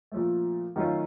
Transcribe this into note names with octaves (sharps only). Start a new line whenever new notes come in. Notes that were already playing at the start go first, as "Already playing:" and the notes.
A#2 F3 A3
D#3 F#3 A3 C#4 F4